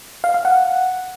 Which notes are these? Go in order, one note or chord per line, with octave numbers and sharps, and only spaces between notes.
F5
F5
F#5